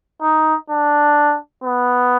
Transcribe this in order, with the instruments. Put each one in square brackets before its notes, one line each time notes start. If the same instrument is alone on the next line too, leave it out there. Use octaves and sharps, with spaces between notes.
[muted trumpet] D#4
D4
B3